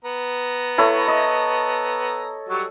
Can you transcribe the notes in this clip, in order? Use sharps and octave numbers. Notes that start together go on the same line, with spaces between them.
B3 A#5
E4 A4 C#5
D#5
F#3 G3 F#4